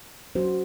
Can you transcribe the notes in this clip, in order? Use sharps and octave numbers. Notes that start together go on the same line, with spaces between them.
F#3 C#4 F#4 C5